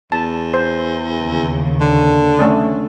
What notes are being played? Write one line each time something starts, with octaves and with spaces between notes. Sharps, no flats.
E2 A5
C5
D#2 C#3
D3
A3 C#4 D4